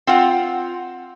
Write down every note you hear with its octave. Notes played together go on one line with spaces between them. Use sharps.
C4 F4 F#5